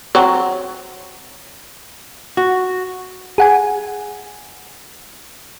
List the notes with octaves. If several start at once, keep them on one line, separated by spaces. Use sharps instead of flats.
F#3 C4
F#4
G#4 F#5 G#5